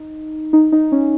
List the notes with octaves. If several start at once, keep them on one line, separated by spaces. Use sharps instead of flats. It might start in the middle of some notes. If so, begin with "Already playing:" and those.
Already playing: D#4
D#4
D#4
C#4